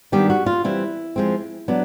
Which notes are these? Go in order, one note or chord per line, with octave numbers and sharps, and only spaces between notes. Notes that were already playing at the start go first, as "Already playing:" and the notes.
D#3 G3 B3 D4 G4
F#4
F4
E3 G3 C4 E4
F3 G#3 C4
F#3 B3 D4